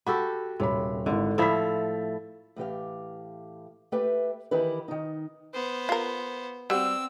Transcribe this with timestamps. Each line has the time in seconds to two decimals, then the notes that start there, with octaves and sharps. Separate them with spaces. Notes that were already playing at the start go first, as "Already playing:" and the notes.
0.07 F#4 G4 A4 B5
0.60 D#1 C3 C#5 B5
1.06 G#1 D3 E4
1.38 A2 F3 E4 A4 B5 B6
2.56 A2 E3 G4 F5
3.92 A3 G4 B4 E5 G5
4.51 D#3 E3 E4 G4 B4
4.88 D#3 D#4
5.54 B3 C5
5.89 F4 A#4
6.70 G3 C4 F#4 E6